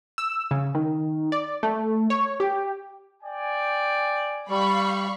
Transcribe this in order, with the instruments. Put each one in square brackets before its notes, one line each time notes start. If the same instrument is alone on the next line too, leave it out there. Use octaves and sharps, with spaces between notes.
[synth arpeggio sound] E6
C#3
D#3
D5
A3
C#5
G4
[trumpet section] D5 G5 G#5
[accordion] G3 [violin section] F5 B5 C#6